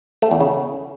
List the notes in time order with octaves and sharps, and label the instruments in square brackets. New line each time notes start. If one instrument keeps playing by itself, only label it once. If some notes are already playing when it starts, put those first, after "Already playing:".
[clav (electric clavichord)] A3
E2
C#3